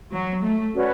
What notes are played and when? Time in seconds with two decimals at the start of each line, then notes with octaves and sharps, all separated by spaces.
0.13 F#3
0.43 A3
0.74 C#4 F#4 B4 D5